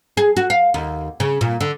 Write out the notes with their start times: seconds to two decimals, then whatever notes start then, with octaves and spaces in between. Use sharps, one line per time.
0.17 G#4
0.37 F#4
0.50 F5
0.74 D#2
1.20 C#3
1.41 A#2
1.61 D3